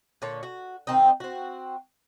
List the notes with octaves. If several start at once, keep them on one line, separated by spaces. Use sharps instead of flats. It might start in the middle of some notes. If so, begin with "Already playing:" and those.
A#2 D3 C#5 A5
F#4
D#3 C4 D#4
C4 F#4